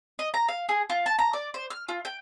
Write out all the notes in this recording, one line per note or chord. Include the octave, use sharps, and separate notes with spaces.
D#5
A#5
F5
G#4
F4
A5
A#5
D5
C5
F6
F4
G5